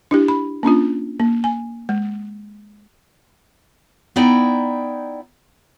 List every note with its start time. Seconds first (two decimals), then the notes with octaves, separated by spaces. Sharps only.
0.11 D4 E4 G4
0.28 B5
0.63 A#3 C#4 D4 F4
1.19 A#3
1.44 G#5
1.89 G#3
4.16 B3 D#4 E4 D5 G5 A#5